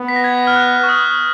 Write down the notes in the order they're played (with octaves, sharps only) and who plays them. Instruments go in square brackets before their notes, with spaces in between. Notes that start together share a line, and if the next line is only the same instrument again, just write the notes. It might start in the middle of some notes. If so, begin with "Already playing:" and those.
Already playing: [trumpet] B3
[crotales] B6
A#6
G#6
F6
F#6
C#6
D#6